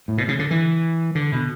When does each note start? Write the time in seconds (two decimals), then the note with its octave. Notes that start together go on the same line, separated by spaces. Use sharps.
0.08 A2
0.18 B2
0.28 C#3
0.39 D3
0.51 E3
1.15 D3
1.32 B2